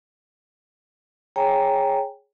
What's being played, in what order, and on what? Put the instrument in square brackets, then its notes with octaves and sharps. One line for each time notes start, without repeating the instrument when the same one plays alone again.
[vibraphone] G#4 C#5 G5 G#5 A#5